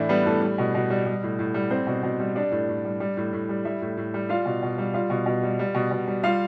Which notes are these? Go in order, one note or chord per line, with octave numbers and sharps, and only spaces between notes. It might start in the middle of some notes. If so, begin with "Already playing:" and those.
Already playing: A2 E3 D4 E4 D5 E5
G3 B3 B4
A2 A4
G3
B2
B2
G3
G3
A2
A2
G3
G3 C4 C5
B2
B2
G3
G3 D4 D5
A2
A2
G3
G3
A2
A2
G3
G3 E4 E5
A2
A2
G3
G3 F4 F5
B2
B2
G3
G3 F4 F5
B2
B2
G3
G3
B2
B2
G3
G3 F4 F5